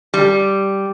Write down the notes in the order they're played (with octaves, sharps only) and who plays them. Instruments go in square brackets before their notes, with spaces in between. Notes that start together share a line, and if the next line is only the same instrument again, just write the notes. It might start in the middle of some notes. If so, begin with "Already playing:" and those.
[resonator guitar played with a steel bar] G3